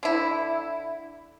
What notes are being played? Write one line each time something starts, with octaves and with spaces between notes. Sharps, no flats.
D3 E4